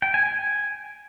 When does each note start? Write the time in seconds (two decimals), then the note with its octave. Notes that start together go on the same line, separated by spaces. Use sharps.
0.02 G5
0.14 G#5
0.26 G#5